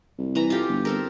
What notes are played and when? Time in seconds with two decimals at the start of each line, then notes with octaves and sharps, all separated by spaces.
0.18 C2
0.35 E3 A#5
0.50 F4 G4 A4
0.69 G1
0.85 C4 A4 A#4